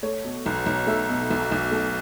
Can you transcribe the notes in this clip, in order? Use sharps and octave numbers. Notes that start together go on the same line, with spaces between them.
A3 C#5
B2
B1
B1
A3 E5
B2
B1
B1
A3